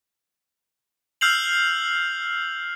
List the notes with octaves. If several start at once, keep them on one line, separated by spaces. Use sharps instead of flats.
E6 F6 G6 C7 F7 F#7